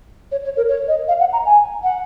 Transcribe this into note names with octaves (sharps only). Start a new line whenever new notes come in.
C#5
C#5
A#4
C#5
D#5
F5
F#5
A#5
G#5
F#5